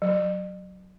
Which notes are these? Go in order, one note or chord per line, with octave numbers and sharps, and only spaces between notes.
F#3